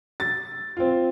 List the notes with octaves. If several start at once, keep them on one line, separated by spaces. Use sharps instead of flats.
A6
C4 F4